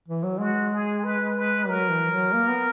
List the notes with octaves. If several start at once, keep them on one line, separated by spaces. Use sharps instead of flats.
E3
F#3
G#3 F#4
G#4
B4
B4
F#3 A#4
E3
F#3
A#3
B3